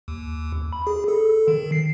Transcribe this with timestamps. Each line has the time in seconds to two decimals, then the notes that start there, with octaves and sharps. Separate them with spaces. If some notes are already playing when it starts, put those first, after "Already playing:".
0.08 D#2
0.73 B5
0.87 G#4
1.08 A4
1.48 D#3
1.72 C7